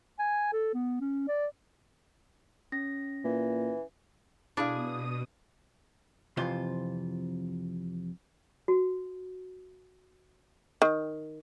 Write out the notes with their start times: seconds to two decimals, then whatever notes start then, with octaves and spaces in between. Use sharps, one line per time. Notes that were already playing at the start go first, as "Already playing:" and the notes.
0.19 G#5
0.53 A4
0.74 B3
1.01 C#4
1.28 D5
2.72 C#4 A#6
3.24 A#2 E3
4.57 B2 D4 E4 G#4 F5 D#6
6.37 F2 C3 E3 F4 C5 C6
8.68 F#4
10.82 D#3